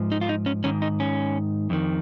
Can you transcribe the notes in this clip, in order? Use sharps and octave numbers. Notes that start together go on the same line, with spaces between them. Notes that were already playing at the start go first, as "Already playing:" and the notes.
Already playing: G#2 F3
D#4
F4
D#4
C#4
G#2 D#3 C#4
D#4
C#4
F2 D#3